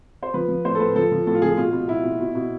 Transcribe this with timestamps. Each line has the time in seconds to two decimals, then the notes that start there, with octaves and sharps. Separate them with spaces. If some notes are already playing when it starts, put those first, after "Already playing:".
0.23 C5
0.34 F3 B4
0.48 F3
0.65 A2 C5
0.75 A4
0.80 A2 B4
0.96 F3 A4
1.12 F3
1.26 A2 A4
1.34 F4
1.42 F3 G#4
1.57 B2 F4
1.73 B2
1.88 B2 E4
2.03 B2
2.20 B2
2.35 B2